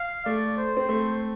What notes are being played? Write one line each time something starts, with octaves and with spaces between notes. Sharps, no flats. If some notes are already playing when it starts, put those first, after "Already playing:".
Already playing: F5
A3 D5
C5
C4
A3